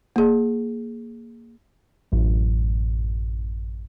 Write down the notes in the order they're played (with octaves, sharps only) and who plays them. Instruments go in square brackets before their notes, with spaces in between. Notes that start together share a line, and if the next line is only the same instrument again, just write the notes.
[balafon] A#3 G#4
[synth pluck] A1 F#2